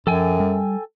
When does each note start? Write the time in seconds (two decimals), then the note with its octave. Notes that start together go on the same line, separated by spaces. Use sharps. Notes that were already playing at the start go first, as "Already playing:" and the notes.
0.07 F#2 F3 A4 G5 G#5
0.40 G3